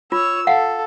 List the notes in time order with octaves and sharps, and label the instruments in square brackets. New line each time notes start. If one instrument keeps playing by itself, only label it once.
[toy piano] F4 [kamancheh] C#5 E6
[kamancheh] A4 [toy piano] F5 F#5